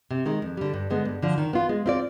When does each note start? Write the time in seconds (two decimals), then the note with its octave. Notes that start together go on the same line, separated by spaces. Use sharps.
0.11 C3
0.26 D#3 G#3
0.42 F2
0.57 D3 G3
0.74 G2
0.90 D3 G#3 B3
1.05 G2
1.22 D3 F3
1.38 D#3
1.53 B3 F4
1.69 G#3
1.86 C4 F4 B4 D5